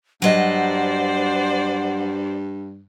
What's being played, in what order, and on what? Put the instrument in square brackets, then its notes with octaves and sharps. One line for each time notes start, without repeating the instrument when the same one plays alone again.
[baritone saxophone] G2 [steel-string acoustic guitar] F#3 D#5 [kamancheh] C5 D5 [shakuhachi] F#5